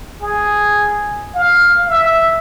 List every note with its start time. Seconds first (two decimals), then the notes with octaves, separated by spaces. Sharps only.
0.22 G#4
1.35 F5
1.88 E5